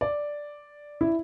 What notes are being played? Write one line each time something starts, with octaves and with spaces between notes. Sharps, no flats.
D5
E4